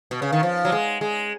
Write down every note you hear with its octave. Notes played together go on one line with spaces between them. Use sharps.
B2
C#3
D#3
F3
F#3
G#3
G#3